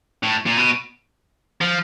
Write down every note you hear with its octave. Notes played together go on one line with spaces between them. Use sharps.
A2
A#2
B2
F3